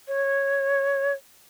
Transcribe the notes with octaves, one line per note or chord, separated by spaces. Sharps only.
C#5